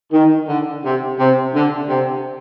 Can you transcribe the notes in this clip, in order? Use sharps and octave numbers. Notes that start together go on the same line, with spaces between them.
D#3
D3
C3
C3
D3
C3